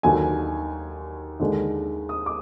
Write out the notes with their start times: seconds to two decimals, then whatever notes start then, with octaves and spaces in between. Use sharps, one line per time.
0.03 D#2 D3 F#3 G#5
1.40 D#2 D3 G#3
2.09 D#6
2.26 D6